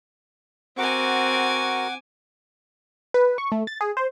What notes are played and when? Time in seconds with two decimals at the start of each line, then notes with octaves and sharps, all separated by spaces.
0.78 C4 F#4 A#4 F#5 G#5 C#6 D6
3.14 B4
3.38 C#6
3.52 A3
3.67 A6
3.81 G#4
3.97 C5